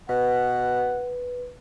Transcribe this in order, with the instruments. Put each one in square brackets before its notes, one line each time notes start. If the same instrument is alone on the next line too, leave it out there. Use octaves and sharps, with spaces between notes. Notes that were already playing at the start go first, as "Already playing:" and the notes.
[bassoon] B2 [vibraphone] B4 [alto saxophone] F#5